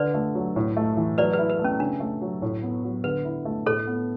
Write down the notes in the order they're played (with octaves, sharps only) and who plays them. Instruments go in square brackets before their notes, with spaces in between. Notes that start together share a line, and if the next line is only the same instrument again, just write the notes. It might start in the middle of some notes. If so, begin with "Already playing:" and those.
Already playing: [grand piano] D3 [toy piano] B4 D5
[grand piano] A3
F#3
A2
A3
E3
[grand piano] F#3 [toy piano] B4 D5
[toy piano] B4
[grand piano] E4
[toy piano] B4
[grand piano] A3
[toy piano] C#4
[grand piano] C#3 [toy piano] D4
[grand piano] A3
F#3
A2
B3
F#3
[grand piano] D3 [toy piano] B4
[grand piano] E4
A3
[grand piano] A2 [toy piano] A4 C#5
[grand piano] B3